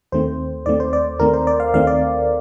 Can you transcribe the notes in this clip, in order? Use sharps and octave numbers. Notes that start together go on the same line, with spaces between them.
D#2 D#3 A3 C4 C5
D#2 D#3 A3 C4 D5
C5
D5
D#2 D#3 A3 C4 A#4
C5
D5
F5
D#2 D#3 A3 C4 F5
D5